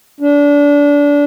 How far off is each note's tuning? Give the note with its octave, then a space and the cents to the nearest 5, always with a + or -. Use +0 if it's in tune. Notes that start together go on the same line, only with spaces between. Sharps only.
D4 -25